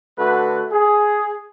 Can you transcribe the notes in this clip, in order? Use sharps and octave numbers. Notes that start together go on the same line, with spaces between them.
D3 A3 F#4 B4
G#4